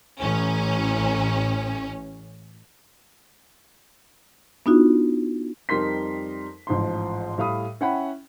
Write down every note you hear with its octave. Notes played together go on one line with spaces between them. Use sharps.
A1 C#4
B3 D4 D#4 F4 F#4
F2 G3 D#4 A#4 C6 B6
A1 G#2 F3 C6
A2 G3 F5 B5 D#6
C#4 E4 F#5 G5 B5